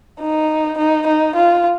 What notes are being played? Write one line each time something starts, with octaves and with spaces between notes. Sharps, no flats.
D#4
D#4
D#4
F4